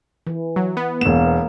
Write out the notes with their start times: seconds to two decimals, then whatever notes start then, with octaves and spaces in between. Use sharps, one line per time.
0.27 E3
0.56 F#3
0.77 B3
1.01 E1 A#3 E7